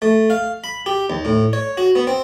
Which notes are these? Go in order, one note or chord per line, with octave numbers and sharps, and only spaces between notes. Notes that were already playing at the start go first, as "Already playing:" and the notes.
A3
F5
B5
G4
D#2
A2
C#5
F#4
B3
C4